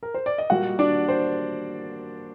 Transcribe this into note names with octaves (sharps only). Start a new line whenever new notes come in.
A#4
C5
D5
D#5
A#2 G3 A#3 F#4 F#5
D4 D5
C5